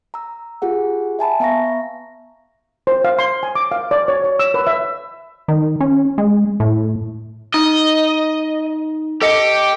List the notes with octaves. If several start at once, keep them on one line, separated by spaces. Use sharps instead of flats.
A#5 E6
F4 G4 G#4 F#5
E5 G#5 A5 B5
B3 E5 F5 A#5 C#6 A#6
C5
F5
C6
G#5
D6
F5
D5
C#5
C#5
E6
B4
E5
D#3
C#4
G#3
A2
D#4 D#5
G4 A4 D#5 C#7